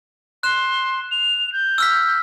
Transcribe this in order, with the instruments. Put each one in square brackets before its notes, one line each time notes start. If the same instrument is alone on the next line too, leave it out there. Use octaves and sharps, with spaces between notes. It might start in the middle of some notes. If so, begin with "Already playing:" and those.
[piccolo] C6 [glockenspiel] F#6 E7
[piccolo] F7
G6
[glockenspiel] E6 F6 B6